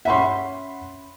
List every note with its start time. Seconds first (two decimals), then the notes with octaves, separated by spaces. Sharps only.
0.05 C#4 E5 F#5 B5 C6